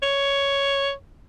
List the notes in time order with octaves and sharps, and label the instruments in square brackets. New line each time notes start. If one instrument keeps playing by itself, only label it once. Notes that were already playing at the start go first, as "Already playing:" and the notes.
[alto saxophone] C#5